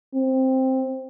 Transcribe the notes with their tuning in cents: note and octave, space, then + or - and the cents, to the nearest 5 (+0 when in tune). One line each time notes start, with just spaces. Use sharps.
C4 +5